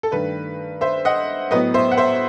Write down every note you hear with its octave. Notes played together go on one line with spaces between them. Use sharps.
A4
G2 D#3 A3 B4
C5 E5
D#5 F#5
A2 F#3 B3 B4 D#5
C5 E5
F#5
C5 E5